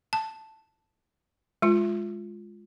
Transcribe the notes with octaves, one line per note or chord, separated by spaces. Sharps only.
A5
G#3 F4